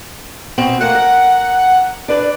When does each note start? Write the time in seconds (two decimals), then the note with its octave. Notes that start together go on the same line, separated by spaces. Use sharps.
0.58 B2 C4 F#4
0.81 A3 A#3 F#5
0.95 A#4
2.08 D4 B4 D5